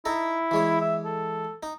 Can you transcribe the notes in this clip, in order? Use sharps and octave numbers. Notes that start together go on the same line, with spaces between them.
D#4 E4 A4 A#5
E3 G#3 C#5
E5
A4
D#4